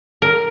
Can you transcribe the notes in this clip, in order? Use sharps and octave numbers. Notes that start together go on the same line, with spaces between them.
A#4